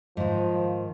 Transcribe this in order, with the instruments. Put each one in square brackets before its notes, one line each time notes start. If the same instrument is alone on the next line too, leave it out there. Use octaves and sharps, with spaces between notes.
[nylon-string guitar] G#2 D#3 [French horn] F3